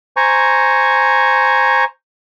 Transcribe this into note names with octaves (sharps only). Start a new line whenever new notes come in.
C5 G#5 A#5 C#6